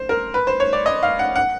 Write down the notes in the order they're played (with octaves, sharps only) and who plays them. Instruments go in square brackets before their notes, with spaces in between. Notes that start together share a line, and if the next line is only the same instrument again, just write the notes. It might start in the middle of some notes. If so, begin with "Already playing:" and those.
Already playing: [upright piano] C5
A#4
B4
C5
C#5
D5
D#5
F5
F#5
F#5